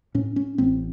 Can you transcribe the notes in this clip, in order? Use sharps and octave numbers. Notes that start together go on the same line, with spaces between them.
A2 C#4
C#4
A1 C4